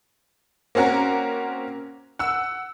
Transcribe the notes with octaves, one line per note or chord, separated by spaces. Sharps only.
A#3 C4 C#4 F#4 A#4
F#5 E6